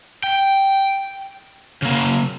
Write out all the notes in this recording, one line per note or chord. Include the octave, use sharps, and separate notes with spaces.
G5
C#3 A#3